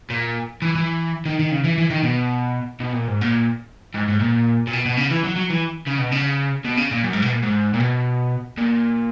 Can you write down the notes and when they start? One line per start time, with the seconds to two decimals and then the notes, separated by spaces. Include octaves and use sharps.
0.10 A#2
0.62 E3
0.75 E3
1.26 D#3
1.39 D#3
1.52 C#3
1.64 E3
1.78 E3
1.90 D#3
2.04 B2
2.80 B2
2.93 A#2
3.08 G#2
3.21 A#2
3.95 G#2
4.09 G#2
4.20 A#2
4.67 A#2
4.73 B2
4.86 B2
4.97 C#3
5.11 E3
5.24 F#3
5.36 F#3
5.50 E3
5.87 C#3
5.99 B2
6.12 C#3
6.65 B2
6.77 C#3
6.91 A#2
7.03 F#2
7.13 G#2
7.22 B2
7.32 A#2
7.42 G#2
7.74 A#2
7.80 B2
8.58 A#2